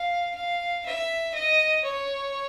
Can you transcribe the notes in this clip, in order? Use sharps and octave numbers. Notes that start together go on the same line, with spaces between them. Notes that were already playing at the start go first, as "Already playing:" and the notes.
Already playing: F5
F5
E5
D#5
C#5